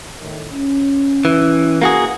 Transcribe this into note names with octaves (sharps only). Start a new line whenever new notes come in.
A2 D#3
C#4
E3
A#3 F#4 G#4